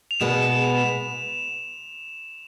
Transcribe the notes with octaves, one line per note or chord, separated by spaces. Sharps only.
F7
B2 G#3 B3 E7
E7
E7